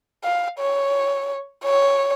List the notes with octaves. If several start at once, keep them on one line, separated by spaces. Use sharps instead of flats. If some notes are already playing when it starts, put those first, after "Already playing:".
F5
C#5
C#5